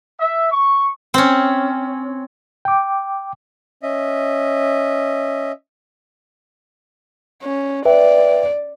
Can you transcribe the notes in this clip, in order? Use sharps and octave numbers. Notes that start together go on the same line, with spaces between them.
E5
C#6
C4 C#4
G5 D6
C#4 D#5 E5
C#4
B4 D5 E5 G5